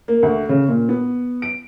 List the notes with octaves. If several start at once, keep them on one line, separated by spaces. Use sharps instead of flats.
A#3
D2
C#3
A#2
B3
D7